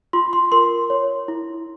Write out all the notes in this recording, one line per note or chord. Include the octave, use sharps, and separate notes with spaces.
F4 C6
C6
A#4 C6
C#5
E4